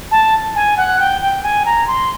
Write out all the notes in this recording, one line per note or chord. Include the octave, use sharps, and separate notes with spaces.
A5
G#5
F#5
G5
G5
G#5
A#5
C6